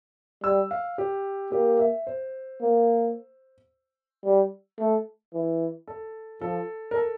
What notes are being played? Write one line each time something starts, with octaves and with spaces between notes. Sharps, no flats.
G3 E6
F5
G4
A#3 G4
E5
C5
A#3
G3
A3
E3
A4
F3 A4
A#4
A4